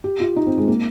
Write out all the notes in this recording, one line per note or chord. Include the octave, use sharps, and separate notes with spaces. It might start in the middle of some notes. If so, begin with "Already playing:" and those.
G4
F4
D#4
C4
G#3
A#3